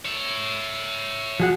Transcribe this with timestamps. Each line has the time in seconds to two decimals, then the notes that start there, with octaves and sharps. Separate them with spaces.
0.05 C#5 E5
1.40 F3 F#4 G#4 F#5